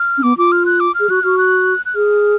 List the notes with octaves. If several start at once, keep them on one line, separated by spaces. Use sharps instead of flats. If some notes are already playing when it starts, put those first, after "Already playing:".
Already playing: F6
C#4
B3 D6
F4 D6
F6
F#6
D6
F6
G#4
F#4 F#6
F#4 F6
F#6
F#6
G#4 F6